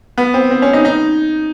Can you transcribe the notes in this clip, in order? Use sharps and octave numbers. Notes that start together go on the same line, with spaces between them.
B3
C4
C4
C#4
D#4
D#4